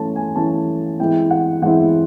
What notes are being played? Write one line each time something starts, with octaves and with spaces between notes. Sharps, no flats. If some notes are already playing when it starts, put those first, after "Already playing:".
Already playing: E3 A3 C#4 A5
G#5
E3 A3 C#4 A5
E3 G#3 C4 E4 G5
F#5
E3 G#3 C4 E4 F#5